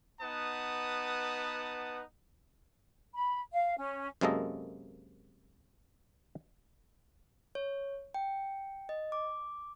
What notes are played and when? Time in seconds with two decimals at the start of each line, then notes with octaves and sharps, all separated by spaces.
0.21 B3 D#4 B4 F#5 A5 D#6
3.14 B5
3.52 F5
3.78 C#4
4.21 F#2 C3 G#3 A#3 A4 D#5
7.55 C#5
8.15 G5
8.89 D#5
9.12 D6